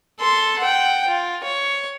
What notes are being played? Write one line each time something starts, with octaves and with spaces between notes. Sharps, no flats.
A4 C6
F#5 G5
F4
C#5